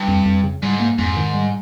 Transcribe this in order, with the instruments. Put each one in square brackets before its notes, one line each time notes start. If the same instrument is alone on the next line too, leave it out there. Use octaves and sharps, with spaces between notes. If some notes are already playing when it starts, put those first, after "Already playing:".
Already playing: [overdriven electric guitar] G2
[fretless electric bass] F2
F2
C#3
[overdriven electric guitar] G#2 [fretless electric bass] G3
[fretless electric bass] A#3
[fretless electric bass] F2 [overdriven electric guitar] G#2
[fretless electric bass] D#3
G3